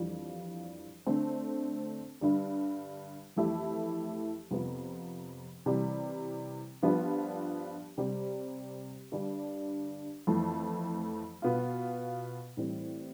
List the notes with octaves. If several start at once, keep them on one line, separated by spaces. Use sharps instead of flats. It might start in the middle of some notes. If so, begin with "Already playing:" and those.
Already playing: F2 E3 G3 D4 F4
D3 A3 C4
G2 D3 G3
F2 E3 A3 E4 G4
F2 C3 F3 B3
C3 E3 G3
G2 F3 B3 D4 G4
C3 G3 C4 G4
G2 D3 G3 D4
F2 E3 A3
B2 B3 F4
A2 E3 G3 C4